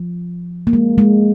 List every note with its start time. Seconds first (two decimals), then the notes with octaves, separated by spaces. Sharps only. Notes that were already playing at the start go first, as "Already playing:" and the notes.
Already playing: F3
0.67 A#3
0.73 G#3
0.98 G#3